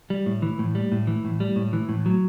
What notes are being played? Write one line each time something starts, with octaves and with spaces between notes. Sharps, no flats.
G3
A2
E3
A2
G3
A2
E3
A2
G3
A2
E3
A2
F#3